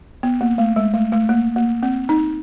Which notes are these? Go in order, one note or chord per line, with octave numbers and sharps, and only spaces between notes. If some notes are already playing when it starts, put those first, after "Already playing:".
B3
A#3
A3
G#3
A3
A3
A#3
A#3
C4
D#4